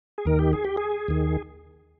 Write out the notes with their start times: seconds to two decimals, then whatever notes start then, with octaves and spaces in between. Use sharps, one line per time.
0.18 G#4
0.25 D#2 D#3 A#4
0.39 G4
0.53 G#4
0.64 G4
0.77 G#4
1.08 D#2 D#3